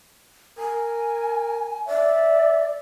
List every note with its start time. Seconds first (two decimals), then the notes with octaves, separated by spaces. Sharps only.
0.58 A#4 G#5
1.87 D5 E5